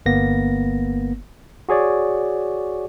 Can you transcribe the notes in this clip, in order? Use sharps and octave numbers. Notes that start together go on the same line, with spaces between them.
G1 A#3 B3 A#6
F#4 G#4 C#5 D5